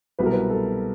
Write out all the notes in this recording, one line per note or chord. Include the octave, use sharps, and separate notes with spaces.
C2 B2 F#3 B4
A#4
B4
A4